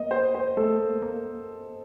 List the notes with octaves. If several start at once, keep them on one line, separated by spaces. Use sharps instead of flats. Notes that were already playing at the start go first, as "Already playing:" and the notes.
Already playing: A#3 D#5
C5
C5
A3 A4
A#3
A#3